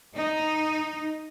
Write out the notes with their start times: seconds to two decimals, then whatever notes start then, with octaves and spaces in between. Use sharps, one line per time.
0.15 D#4